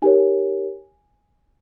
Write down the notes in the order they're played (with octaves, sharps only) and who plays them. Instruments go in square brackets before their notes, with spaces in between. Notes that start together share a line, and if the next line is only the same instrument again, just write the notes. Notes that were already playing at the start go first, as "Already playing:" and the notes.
[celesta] D#4 G4 A#4 C#5 G#5